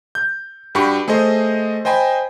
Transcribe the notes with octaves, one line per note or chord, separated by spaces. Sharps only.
G6
G2 F#4 G4 B5 C#6
A3 G#4 C5 D#5
C5 D#5 G5 G#5 B5